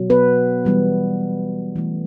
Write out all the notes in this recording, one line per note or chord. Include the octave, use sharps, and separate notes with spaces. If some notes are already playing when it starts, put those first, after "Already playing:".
Already playing: B2 F#3
B3 B4
E3 G3 B3
E3 A3